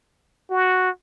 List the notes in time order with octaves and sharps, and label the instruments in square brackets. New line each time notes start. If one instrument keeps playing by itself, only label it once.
[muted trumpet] F#4